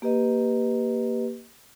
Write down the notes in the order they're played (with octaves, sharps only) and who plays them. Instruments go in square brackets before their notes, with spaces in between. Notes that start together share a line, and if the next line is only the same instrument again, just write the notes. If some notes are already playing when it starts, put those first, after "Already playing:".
[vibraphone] A#3 G4 B4 D#5